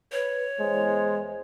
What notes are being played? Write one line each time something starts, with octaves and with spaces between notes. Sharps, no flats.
B4 C#5
E2 G#3 C5